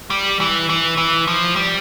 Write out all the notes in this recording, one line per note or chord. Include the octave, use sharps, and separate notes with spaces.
G3
E3
E3
E3
F3
G3